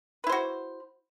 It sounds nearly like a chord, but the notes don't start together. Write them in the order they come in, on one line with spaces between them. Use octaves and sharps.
B4 E4 C5 F#4